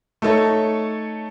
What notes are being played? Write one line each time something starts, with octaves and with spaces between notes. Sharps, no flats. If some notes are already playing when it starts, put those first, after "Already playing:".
A3 D#4 A4 C#5